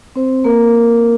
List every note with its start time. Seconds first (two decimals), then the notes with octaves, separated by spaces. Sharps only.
0.16 C4 C5
0.44 A#3 A#4